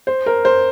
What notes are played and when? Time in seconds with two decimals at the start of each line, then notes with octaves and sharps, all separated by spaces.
0.07 C5
0.26 A#4
0.45 C5